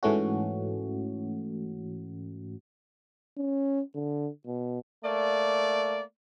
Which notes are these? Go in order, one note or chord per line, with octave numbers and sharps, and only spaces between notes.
G#2 E3 A3 C#4 F#4
C#4
D3
B2
A3 A#3 D5